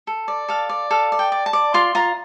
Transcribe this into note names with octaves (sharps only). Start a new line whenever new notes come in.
A4
D5
A4 F5
D5
A4 F5
D5
G5
D5
A5
D5
F4 C6
F4 A#5